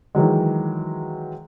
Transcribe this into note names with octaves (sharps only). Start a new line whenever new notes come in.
D#3 E3 F#3 G#3